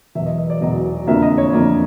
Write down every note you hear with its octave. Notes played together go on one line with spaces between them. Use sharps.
E1 E2 B2 F#3 E5
D#5
D#5
D5
E1 E2 B2 F#3 D#5
F2 D3 F3 A#3 E5
D#5
C#5
F2 D3 F3 A#3 D5